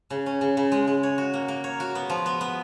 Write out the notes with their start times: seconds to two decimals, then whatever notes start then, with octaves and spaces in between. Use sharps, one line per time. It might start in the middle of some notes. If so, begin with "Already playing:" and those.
0.10 C#3
0.26 C#4
0.41 C#3
0.57 C#3
0.72 G#3
0.87 G#3
1.03 C#5
1.18 F#4
1.34 A#3
1.48 A#3
1.64 C#5
1.80 F#4
1.95 B3
2.10 F3
2.26 B3
2.41 B3